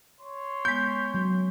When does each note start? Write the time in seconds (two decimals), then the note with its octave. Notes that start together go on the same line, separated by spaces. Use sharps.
0.20 C#5 C6
0.65 G#3 B3 G6
1.14 F#3